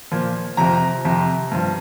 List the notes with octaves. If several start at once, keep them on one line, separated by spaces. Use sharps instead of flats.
A#2 F3
F2 C3 F3 A#5
F2 C3 F3
G2 F3